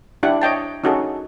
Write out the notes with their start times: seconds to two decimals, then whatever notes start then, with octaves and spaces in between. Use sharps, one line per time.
0.23 D4 E4 G4 F#5
0.42 C#5 D#5 G5 A5
0.84 C#4 D#4 F#4 G#4 A4